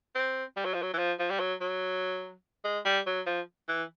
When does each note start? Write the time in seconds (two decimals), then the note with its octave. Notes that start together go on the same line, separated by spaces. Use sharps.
0.15 C4
0.57 G3
0.65 F#3
0.74 F3
0.82 F#3
0.94 E3
0.98 F3
1.19 F3
1.30 G3
1.40 F#3
1.61 F#3
2.65 G#3
2.85 G3
3.06 F#3
3.26 F3
3.69 E3